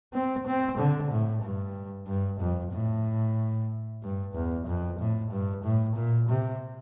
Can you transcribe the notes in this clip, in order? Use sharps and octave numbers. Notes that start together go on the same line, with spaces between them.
C4
C4
D3
A2
G2
G2
F2
A2
G2
E2
F2
A2
G2
A2
A#2
C3